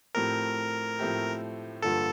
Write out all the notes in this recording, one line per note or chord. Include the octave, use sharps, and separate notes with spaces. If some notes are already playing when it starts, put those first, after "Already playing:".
A2 F3 A3 C4 G4 A#4
A2 F3 A3 C4 G4
G2 D3 F3 A#3 F4 A4